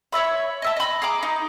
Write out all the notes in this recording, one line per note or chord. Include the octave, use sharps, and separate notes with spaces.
C#5 D5 E5 B5
D#5 E5 A5
D#5 B5
G#4 A#5 D6
D#4